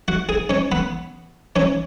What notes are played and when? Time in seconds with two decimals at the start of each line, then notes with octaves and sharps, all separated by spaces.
0.08 F#4 F#5
0.29 G#4 G#5
0.50 C#4 C#5
0.72 B3 B4
1.56 C#4 C#5